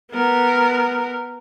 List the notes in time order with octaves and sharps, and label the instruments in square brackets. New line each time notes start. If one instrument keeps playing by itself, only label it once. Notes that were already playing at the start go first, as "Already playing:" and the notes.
[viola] B3 A#4